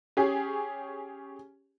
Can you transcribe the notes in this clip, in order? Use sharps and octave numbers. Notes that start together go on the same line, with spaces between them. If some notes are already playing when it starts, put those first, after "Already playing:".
C#4 G4 G#4